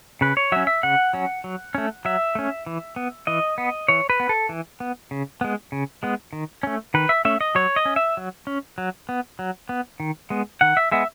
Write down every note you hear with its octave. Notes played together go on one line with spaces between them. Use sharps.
C#3 B4
C#5
F#3 C#4 E5
E5
C#3 F#5
F#3 C#4
F#3
A3 C#4
F#3 E5
A3 C#4
E3
B3
E3 D#5
B3
E3 C#5
B4
B3
A4
E3
B3
C#3
G#3 B3
C#3
G#3 B3
D#3
A3 C#4
D#3 B4
E5
A3 C#4 E5
D#5
F#3 C#5
D#5
C#4
E5
F#3
C#4
F#3
B3
F#3
B3
D#3
G#3 B3
D#3 F#5
E5
G#3 B3 E5